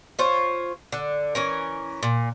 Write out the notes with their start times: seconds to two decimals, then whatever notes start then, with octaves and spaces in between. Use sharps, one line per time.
0.19 F4 C5 C#5
0.92 D3
1.35 E3 C#4 A#4
2.03 A#2